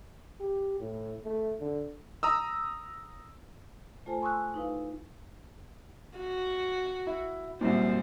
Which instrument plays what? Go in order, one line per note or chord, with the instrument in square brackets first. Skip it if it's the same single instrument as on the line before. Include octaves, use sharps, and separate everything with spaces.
[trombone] G4
A2
A3
D3
[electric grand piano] A#5 D#6 E6
[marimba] A3 F4 A4 C5 G#5 A5
G#5 C6 C#6 D#6 E6 F#6
D#4 E4 B4 F5
[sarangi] F#4
[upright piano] E4
[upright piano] C2 F#2 A#2 [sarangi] C5